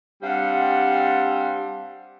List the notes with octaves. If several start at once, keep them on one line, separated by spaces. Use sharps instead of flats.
G3 C4 D4 F5 F#5